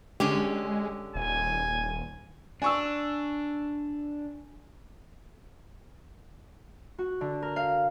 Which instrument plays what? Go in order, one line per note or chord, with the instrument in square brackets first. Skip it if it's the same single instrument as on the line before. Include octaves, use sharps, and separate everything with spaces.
[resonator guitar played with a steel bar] D3 C#4 G4 [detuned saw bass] G#3
[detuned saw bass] D#1 [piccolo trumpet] G#5
[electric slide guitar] D4 [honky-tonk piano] G#5 C#6 E6
[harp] F#4
D3
A#4
F5